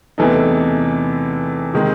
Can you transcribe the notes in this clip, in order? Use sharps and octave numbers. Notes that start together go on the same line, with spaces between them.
E2 C3 E3 A3 D#4
C3 D#3 G#3